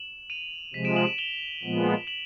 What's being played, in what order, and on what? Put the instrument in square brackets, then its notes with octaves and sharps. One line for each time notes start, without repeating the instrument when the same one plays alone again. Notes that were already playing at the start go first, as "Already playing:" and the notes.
Already playing: [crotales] E7 F#7
D#7 F7
[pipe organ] C3 F3 G#3 [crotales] B6
[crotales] D7 E7
E7 F#7
E7 F#7
F7 G7
[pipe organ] A#2 F3 G#3 B3
[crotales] E7 F#7